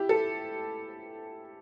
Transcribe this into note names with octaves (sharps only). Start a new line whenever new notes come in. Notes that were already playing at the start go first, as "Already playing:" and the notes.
Already playing: E4 G4
A4